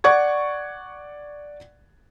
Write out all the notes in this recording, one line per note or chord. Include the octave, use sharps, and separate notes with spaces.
D5 F#5 C#6 G#6